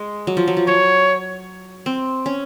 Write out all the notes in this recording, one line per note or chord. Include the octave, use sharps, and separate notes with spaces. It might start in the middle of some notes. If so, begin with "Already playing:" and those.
Already playing: G#3
F#3
F3
F#3
F3
F#3 C#5
C4
C#4